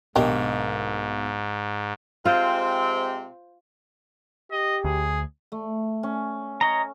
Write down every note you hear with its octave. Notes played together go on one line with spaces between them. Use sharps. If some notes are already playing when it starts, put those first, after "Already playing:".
B1 G#2 D#3 A#3 D4 G4
C3 G#3 C4 F4 C5
G4 D#5
D2 G#4
A3
C#4
C#5 D#5 A#5